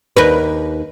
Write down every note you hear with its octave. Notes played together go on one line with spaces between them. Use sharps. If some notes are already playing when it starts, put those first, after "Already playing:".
D#2 A#4 B4